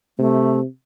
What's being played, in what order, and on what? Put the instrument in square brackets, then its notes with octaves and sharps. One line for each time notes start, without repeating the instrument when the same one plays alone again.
[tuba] C3 [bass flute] A3